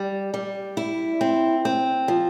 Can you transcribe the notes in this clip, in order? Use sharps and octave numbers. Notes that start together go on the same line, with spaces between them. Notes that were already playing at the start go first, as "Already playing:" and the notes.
Already playing: G3
G3
E4
C4
C4
F3